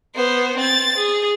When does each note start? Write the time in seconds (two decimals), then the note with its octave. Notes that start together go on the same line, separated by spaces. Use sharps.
0.15 B3 C5
0.57 C4 A6
0.97 G#4